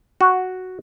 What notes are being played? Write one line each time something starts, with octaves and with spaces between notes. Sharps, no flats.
F#4